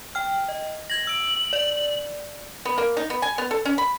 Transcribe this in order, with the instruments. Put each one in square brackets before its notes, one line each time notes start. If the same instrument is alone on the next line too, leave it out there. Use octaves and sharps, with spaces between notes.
[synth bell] G5 F6
D#5
[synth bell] G#6 A#6 [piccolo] F#7
[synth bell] E6 D7
D5
[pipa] B3
A#3
D#4
B3
G#5
B3
A4
C#4
B5